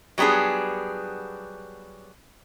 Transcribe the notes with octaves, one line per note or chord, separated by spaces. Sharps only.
F#3 G3 B3 D4 G#4